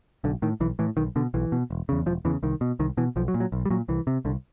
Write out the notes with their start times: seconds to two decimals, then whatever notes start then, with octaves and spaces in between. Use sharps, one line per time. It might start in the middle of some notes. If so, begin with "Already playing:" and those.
0.24 B1 D3
0.42 A2 D#3
0.60 B1 E3
0.79 A2 E3
0.97 B1 D#3
1.16 B2 D3
1.34 B1 E3
1.52 B2
1.70 E1
1.89 E2 C#3
2.06 E1 F3
2.25 E2 C#3 E3
2.43 C2 D#3
2.61 B2
2.79 C2 D#3
2.97 B2 E3
3.16 B1 F3
3.28 F#3
3.34 A#2
3.40 F#3
3.52 B1
3.65 G3
3.70 A#2 F#3
3.88 C2 E3
4.07 C3
4.25 C2 D3